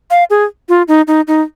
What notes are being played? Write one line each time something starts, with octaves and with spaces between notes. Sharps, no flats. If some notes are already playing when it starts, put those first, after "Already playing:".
F5
G#4
F4
D#4
D#4
D#4